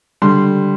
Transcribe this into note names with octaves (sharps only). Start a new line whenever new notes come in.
D3 G3 C6